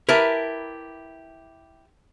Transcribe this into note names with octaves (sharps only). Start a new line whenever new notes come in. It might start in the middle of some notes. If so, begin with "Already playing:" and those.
E4 G4 A#4 B4 A5